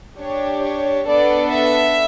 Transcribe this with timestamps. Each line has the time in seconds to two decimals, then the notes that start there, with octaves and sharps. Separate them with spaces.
0.18 D4 G4 C#5
0.62 C#5
1.07 B3 D4 A4 D5
1.51 E5